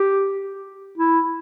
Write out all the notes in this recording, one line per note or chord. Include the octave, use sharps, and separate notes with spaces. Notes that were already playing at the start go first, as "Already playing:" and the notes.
Already playing: G4
E4